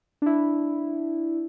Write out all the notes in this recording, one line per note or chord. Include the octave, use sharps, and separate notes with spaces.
D4 E4